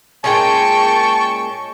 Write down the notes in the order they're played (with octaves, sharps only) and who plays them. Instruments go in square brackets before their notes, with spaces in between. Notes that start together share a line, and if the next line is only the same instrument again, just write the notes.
[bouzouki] A#2 G#3 C#4 [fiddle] G5 [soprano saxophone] A5 [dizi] C#6